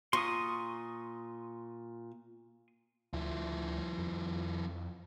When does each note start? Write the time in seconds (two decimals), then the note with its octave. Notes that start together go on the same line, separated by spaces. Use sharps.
0.13 A#2 C6 C#6 D#6
3.13 D2 F3 E4
3.99 F2